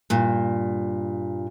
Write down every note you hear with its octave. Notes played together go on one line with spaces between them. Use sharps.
G2 A#2